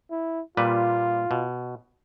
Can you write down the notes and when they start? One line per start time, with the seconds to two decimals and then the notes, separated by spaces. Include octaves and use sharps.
0.11 E4
0.57 A#2 G3 F4 B4
1.31 B2